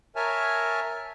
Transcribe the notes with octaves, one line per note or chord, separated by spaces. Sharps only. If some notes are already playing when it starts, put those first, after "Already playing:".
A#4 C#5 E5 G#5 A5 F6